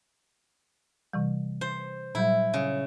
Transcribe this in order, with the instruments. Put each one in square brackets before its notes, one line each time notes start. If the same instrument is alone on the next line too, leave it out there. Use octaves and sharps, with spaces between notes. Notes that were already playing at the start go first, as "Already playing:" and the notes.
[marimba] C3 E3 G3
[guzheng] C5
[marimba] A#2 F#3 G3 [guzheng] E4
[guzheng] C#3